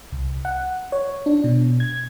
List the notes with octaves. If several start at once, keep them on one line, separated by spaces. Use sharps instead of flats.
C2
F#5
C#5
D4
B2
G#6